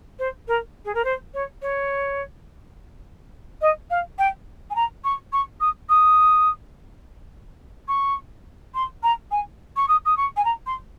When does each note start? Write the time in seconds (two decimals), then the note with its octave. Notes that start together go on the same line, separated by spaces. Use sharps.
0.19 C5
0.48 A#4
0.85 G#4
0.95 A#4
1.04 C5
1.34 C#5
1.62 C#5
3.61 D#5
3.90 F5
4.19 G5
4.70 G#5
4.75 A#5
5.04 C#6
5.33 C#6
5.60 D#6
5.89 D#6
7.88 C#6
8.74 C6
9.03 A#5
9.31 G#5
9.76 C#6
9.88 D#6
10.05 D#6
10.17 C#6
10.37 G#5
10.45 A#5
10.66 C6